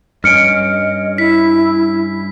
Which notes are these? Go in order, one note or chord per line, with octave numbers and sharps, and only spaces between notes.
G2 C#4 D#5 F6 C#7 D7
E4 B6